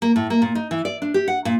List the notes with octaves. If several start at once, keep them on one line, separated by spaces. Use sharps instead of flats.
A#3
A2
A#3
A#2
D#4
E3
D5
D4
G4
F#5
A#2